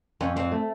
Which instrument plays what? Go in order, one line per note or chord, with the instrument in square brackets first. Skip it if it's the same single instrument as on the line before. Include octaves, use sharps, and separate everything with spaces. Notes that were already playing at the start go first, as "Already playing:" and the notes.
[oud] F2 [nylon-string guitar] C#4
[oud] F2 [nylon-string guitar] C4
[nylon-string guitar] A3